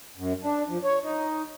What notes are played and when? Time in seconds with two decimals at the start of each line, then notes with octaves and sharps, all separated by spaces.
0.17 F#2
0.43 D4
0.69 F3
0.84 C#5
1.03 D#4